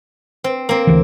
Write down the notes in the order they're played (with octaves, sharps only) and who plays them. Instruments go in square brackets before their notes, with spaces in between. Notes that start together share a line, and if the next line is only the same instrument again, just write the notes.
[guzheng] C4
A#3 C4
[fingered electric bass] D2 E3